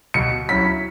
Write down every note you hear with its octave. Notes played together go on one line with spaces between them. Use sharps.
B2 C#7
F#3 C#4 E4 B6